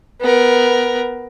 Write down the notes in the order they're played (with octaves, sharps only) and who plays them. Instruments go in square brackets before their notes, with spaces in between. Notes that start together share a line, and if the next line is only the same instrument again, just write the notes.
[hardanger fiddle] B3 A#4